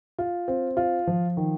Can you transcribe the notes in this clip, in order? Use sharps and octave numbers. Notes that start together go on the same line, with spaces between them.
F4
C4
F4
F3
D#3